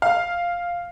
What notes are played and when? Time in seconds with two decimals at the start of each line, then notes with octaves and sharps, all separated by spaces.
0.02 F5